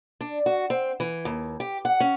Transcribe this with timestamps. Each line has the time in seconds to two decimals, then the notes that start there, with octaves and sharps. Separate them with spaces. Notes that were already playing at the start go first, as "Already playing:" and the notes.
0.21 D4
0.46 F#4
0.70 C4
1.00 E3
1.25 D#2
1.60 G4
1.85 F#5
2.00 C#4